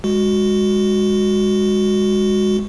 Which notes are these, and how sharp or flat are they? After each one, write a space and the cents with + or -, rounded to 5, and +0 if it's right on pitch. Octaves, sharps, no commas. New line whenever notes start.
G#3 -20 F#4 -5